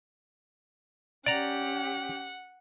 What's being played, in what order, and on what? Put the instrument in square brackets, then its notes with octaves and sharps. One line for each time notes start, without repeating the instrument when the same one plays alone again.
[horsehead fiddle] C#4 G4 [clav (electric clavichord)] D5 A#5 [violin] F#5